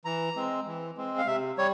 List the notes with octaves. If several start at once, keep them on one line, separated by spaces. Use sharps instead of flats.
E3 A#5
G#3 C4
E3
G#3 C4
F5
C3 E5
G3 C#5